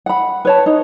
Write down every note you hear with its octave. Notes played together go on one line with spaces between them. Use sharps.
F#5 B5
B4 C#5 A5
D#4